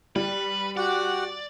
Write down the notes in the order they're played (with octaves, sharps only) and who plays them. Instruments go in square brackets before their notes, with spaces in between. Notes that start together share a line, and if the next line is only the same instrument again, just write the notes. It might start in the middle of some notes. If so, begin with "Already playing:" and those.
[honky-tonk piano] G3 [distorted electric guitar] B4
[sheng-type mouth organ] F#4 G4 F#5 [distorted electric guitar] D5